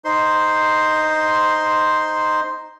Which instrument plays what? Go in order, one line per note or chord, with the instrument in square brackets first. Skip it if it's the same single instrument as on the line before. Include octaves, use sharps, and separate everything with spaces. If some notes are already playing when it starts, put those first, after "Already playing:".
[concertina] D#4 C5 C6